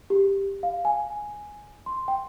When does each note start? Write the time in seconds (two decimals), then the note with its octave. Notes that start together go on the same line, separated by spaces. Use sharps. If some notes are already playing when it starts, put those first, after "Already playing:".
0.10 G4
0.63 F5
0.85 G#5
1.86 C6
2.08 G5